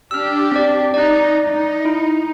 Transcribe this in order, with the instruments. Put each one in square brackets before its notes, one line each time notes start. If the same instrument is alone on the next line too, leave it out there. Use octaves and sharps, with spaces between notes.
[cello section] D4 G4 [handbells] E6 F6
[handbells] C4 D5
[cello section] D#4 [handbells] D5 F#6
[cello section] D#4
[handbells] E4